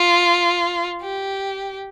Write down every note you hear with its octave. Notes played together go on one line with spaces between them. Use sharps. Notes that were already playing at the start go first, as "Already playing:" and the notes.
Already playing: F4
G4